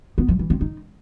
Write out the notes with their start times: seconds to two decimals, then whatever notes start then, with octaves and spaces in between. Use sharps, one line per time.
0.18 B3
0.29 F3
0.39 E3
0.50 C4
0.61 D#4